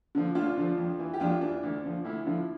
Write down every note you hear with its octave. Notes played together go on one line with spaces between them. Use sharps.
D3 F3
D2 D4 F4
D3 F3
F2
E3
G4
F2 D4 F4
E3 D4
D2
D3 F3
D2 E4
D3 F3